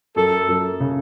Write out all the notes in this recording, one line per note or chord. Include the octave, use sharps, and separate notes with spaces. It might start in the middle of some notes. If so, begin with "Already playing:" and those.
F#2 A4
F#2
C#3